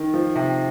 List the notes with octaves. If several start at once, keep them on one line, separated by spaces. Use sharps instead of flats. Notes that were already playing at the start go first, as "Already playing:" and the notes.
Already playing: D#3
F3
C3